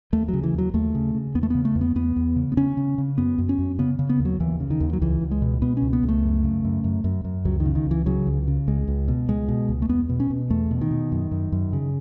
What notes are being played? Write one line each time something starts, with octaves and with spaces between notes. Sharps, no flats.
D#2 A3
F#3
C#3
E3
D#2 F#3
D#2 A3
C#3
C#3
E2 B3
A3
C#3 B3
A3
E2
B3
E2 B3
E2
C#3
B3
C#3 C#4
C#3
C#3
F#2 B3
F#2
C#4
F#2
C#3 B3
C#3
B3
D#2
F#3
D#2 E3
C#3
D#3
D#2
F#3
C#2 E3
C#2
G#3
B2
B2 B3
C#4
C#2
B3
C#2
A3
F#2
C#3
F#2
F#2
F#2
F#2
C#2 F#3
D#3
C#3
D#3
C#2 E3
C#3 F#3
C#2
C#3
C#2 G#3
C#2
B2
C#2 G#3
B2
C#2
A3
E2 B3
B2
C#4
B2
E2 A3
B2
D#3
B2
F#2
F#2
F#2
C#3